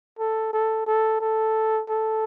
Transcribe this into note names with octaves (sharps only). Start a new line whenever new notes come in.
A4
A4
A4
A4
A4